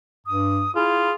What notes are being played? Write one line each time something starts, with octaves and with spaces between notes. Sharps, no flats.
G2 D#6
E4 F4 G#4